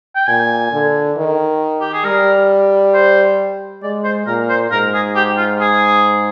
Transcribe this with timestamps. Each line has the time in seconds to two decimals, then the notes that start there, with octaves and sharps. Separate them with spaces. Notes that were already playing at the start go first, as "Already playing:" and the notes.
0.16 G5
0.27 A#2 G#5
0.72 D3
1.17 D#3
1.81 G4
1.93 G#4
2.05 G3 A#4
2.94 C5
3.83 G#3 D5
4.04 C5
4.26 A#2 A#4
4.49 C5
4.71 G#2 A#4
4.94 G#4
5.16 G4
5.37 F4
5.60 G#4